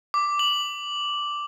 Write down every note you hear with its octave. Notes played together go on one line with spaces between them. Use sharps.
D6
F#7